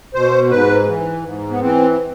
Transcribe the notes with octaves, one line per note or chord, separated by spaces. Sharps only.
B2 C5
G#2 B4
E3
G#2
B3
E3 C4